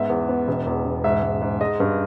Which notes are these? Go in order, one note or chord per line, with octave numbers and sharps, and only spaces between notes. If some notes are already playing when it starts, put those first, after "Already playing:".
Already playing: G#2 B3 E5
E2
B3
E1
E2
E1
G#2 E5
G#2
G#2
G#3 D#5
G2